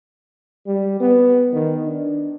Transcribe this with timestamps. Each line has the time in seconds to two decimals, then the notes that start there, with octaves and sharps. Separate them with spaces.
0.67 G3
1.00 B3
1.53 D#3
1.85 D4